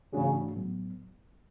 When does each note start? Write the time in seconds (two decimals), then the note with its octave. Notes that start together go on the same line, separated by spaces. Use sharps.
0.13 G#2 C#3 E3 A3 D4 F#4
0.56 A2 F#3 B3